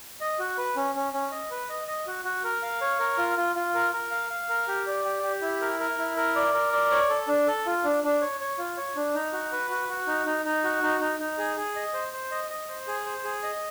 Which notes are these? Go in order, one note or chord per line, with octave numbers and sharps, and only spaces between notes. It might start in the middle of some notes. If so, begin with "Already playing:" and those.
D#5
F#4
B4
C#4
C#4
C#4
D#5
B4
D#5
D#5
F#4
F#4
A#4
F5
C#5
A#4
F4
F4
F4
A#4
A#4
F5
F5
A#4
G4
D5
G4
G4
E4
A#4
A#4
E4
A#4
D5
A#4
D5
C#5
A4
D4
A4
F4
D4
D4
C#5
C#5
F4
C#5
D4
D#4
F#4
B4
F#4
F#4
D#4
D#4
D#4
F#4
D#4
D#4
D#4
G#4
G#4
D#5
C5
C5
D#5
D#5
C5
G#4
C5
G#4
D#5